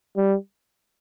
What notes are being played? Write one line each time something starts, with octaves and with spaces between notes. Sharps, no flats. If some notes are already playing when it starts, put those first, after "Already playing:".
G3